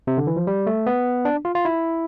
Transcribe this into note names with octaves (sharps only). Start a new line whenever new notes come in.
C3
D3
E3
F3
G3
A3
B3
D4
F4
F4
E4